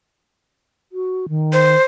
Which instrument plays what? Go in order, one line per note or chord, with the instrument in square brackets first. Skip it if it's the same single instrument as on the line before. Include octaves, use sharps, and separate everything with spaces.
[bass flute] F#4
D#3
[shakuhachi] C5